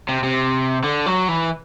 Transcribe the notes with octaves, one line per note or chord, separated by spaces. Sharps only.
C3
C3
D3
F#3
E3